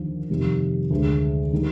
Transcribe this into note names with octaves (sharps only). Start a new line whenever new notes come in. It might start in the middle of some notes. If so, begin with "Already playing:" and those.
Already playing: D#2 D3 F3
F2 C3 D#3 G3
D2 D3 G#3
D#3 G3